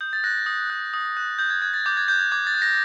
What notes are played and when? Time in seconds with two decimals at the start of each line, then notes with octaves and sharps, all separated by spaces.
0.01 D#6 G6
0.13 A6
0.24 F#6 A#6
0.46 D#6
0.70 F#6
0.94 D#6
1.17 F#6
1.39 D#6 G6
1.50 G#6
1.62 F#6 G#6
1.74 A6
1.86 D6 G6
1.97 G#6
2.08 F#6 G6
2.20 G#6
2.31 D6 G#6
2.47 A6
2.54 F#6
2.62 A#6